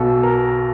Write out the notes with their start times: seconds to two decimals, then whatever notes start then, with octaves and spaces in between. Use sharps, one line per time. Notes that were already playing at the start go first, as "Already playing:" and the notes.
Already playing: B1 B2 A4
0.23 A#4